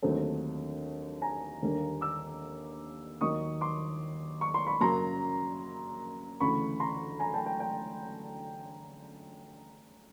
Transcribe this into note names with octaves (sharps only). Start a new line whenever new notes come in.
D#2 D3 F#3 A3 C4
G#5 A#5
D#2 D3 G3 A#3 D4
D6 E6
D#2 D#3 F#3 A#3 C#6 D#6
C6 D6
C#6
C6
B5 C#6
F#2 C#3 F#3 A#3 A#5 C6
D2 C#3 E3 B5 C#6
A#5 C6
G#5 A#5
G5 A5
G5
G5